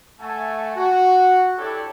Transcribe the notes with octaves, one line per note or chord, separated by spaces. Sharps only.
A3 E5 F#5 G#5 A5 C#6
F#4
D4 E4 G4 A4 C#5 D5